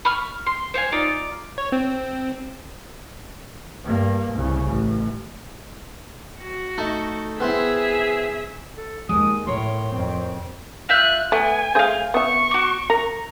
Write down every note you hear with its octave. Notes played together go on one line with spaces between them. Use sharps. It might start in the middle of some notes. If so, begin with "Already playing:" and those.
B5 C#6 F6
C6
C5 C#5 F5 G#5
D#4 F4 D5
C#5
C4
G2 A#3
C2 C#3
A1
F#4
A3 D#4
B3 C4 E4 G#4 E5
A4
D#2 G#3 D#6
A2 A#4 C#5 C6
F2 C4
F4 E5 F#6 G6
A3 B3 G#5
A3 G#4 C5 F5 G6
B3 E5 C#6
F#4 D6
A#4 A#5